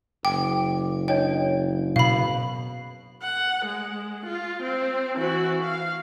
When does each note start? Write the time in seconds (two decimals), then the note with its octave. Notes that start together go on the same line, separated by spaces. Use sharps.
0.25 F#1 G5 D6
1.08 D4 C#5 D#5 G5
1.96 B2 F5 B5
3.22 F#5
3.66 G#3
4.26 F4
4.63 C4
5.16 E3 F#4
5.64 F5